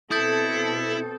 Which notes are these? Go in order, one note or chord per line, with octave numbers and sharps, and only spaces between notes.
B2 C4 E4 A4 D#6 G6 A6